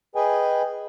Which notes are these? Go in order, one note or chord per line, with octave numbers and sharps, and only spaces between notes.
G#4 B4 D#5 G5 G#5